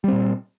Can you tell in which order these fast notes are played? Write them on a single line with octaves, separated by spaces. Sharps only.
G3 C4 A#2